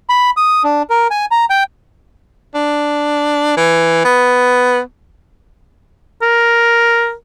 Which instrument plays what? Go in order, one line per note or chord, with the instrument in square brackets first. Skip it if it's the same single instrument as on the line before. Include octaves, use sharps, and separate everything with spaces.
[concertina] B5
D#6
D4
A#4
G#5
A#5
G5
[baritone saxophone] D4
E3
B3
[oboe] A#4